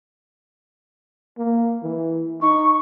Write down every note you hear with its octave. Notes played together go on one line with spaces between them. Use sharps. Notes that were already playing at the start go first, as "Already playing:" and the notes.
A#3
E3
D#4 C#6